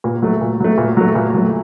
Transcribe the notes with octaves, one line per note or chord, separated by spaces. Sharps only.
A#2
F#3 A3
A#2
F#3 A3
A#2
F#3 A3
A#2
F#3 A3